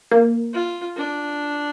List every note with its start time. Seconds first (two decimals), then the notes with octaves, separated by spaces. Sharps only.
0.11 A#3
0.53 F4
0.97 D4